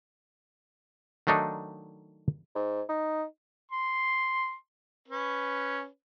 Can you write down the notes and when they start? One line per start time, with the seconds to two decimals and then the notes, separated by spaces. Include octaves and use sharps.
1.27 D#3 F#3 A3 D4 D#4
2.55 G#2
2.89 D#4
3.71 C6
5.08 C#4 B4